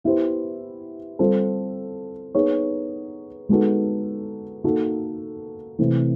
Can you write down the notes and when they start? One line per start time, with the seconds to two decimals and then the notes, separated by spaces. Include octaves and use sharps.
0.04 B3 E4 G4 C5
1.19 G3 C4 F4 A4 C5
2.35 B3 D#4 G#4 C#5
3.49 G#3 B3 D#4 F#4 A4
4.64 A#3 D#4 F#4 A4
5.79 C3 E3 A3 C4